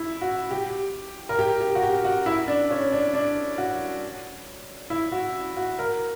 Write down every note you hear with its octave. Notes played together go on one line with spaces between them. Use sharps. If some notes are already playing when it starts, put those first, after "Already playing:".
Already playing: E4
F#4
G4
A#4
G4
G4
F#4
G4
F#4
E4
D4
C#4
D4
D4
F#4
E4
F#4
F#4
A#4